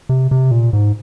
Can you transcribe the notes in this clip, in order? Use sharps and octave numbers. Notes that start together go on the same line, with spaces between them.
C3
C3
A#2
G#2